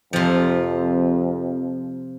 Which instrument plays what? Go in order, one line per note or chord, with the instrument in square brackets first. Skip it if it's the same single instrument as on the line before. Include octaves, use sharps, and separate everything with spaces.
[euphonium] F2 [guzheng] C3 F3